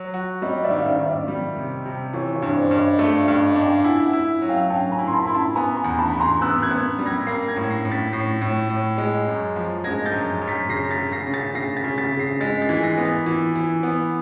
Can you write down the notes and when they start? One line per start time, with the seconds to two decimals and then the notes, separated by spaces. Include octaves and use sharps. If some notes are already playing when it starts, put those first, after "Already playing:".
Already playing: F#3
0.14 F#4
0.42 G3 C#5 D#5
0.64 D5 E5
0.71 D#3
0.78 F5
0.85 D5 E5
1.00 D#3
1.06 D5 E5
1.28 G3
1.56 C3
1.86 C3
2.13 E3 C#5
2.35 C#5
2.42 G2
2.56 C5 D5
2.71 G2
2.77 C#5 D#5
2.99 A3 D5 E5
3.12 F5
3.20 D5 E5
3.28 G2
3.42 D#5 F5
3.56 D4
3.63 F5 G5
3.84 E4 F#5 G#5
4.06 E5 F#5
4.13 E4
4.42 F#3
4.49 F5 G5
4.70 F#3 G5 A5
4.92 G#5 A#5
4.99 E4
5.07 C6
5.13 A5 B5
5.25 E4 C6
5.34 A5 B5
5.56 B3 G#5 A#5
5.77 G#5 A#5
5.84 E2
5.99 A5 B5
6.13 E2
6.20 A#5 C6
6.42 B3 E6 F#6
6.62 F#6 G#6
6.71 B3
6.99 G3
7.06 G#6 A#6
7.27 A#3 A#6 C7
7.48 G#6 A#6
7.56 A2
7.70 A#6 C7
7.85 A2
7.91 A6 B6
8.12 A2 A#6 C7
8.41 A2
8.70 A2
8.98 G#3
9.27 F#2
9.56 F3
9.84 G#3 G#6 A#6
10.06 G6 A6
10.12 F#2
10.42 F#2
10.48 A6 B6
10.69 C#3 A#6 C7
10.91 A6 B6
10.98 C#3
11.12 A#6 C7
11.27 C#3
11.34 A6 B6
11.55 C#3 A#6 C7
11.77 A6 B6
11.84 C#3
11.98 A6 B6
12.12 C#3
12.19 A#6 C7
12.41 G#3 A6 B6
12.58 C7
12.62 A6 B6
12.69 E3
12.83 A#6 C7
12.98 B3
13.05 A6 B6
13.26 E3
13.56 E3
13.83 B3